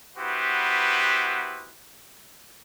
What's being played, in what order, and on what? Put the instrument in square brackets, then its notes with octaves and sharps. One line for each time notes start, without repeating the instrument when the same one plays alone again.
[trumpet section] B3 E4 F#4 G4 B4 C5